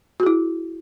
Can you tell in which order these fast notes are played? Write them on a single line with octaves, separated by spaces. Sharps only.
F#4 G#4 E4